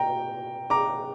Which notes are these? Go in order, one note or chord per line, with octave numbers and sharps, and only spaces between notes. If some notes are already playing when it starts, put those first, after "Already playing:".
Already playing: G5 A#5
A#5 D6